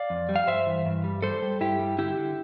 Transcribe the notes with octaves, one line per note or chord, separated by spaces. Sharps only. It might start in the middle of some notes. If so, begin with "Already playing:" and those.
Already playing: D5 F5
F2
G3
F5
G2 C5 E5
E3
G2
G3
G3 A4 C5
G3
G2 E4 G4
G3
D3 E4 G4
D3